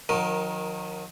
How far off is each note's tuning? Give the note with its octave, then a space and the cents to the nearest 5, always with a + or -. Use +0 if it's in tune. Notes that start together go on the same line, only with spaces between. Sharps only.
D#3 +0 F#3 -40 A#4 +15